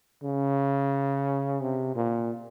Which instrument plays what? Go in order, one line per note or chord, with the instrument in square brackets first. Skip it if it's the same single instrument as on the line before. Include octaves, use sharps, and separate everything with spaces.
[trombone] C#3
C3
A#2